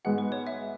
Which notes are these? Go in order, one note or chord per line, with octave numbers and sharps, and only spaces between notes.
G#2 G#3 B3 F#4 F#5
B4
C#5
E5